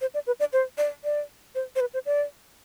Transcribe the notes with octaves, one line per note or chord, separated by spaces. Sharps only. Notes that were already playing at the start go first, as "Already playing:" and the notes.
C5
D5
B4
D5
C5
D5
D5
C5
C5
B4
C5
D5